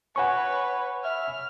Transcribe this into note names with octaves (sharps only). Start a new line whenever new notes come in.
B4 C#5 F#5 G#5 C#6
E5 F6